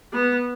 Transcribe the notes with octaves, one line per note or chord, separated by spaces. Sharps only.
B3